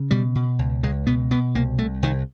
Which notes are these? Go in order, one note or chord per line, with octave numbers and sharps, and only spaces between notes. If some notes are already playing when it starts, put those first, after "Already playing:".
Already playing: C#3
B2 G3
B2
C#2
C#2 G#3
B2 B3
B2 B3
C2 A#3
C2 A3
C2 D#3